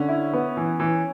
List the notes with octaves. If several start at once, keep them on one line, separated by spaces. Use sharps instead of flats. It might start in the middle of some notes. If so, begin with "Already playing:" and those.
Already playing: D3 C#4
E4
B3
E3
E3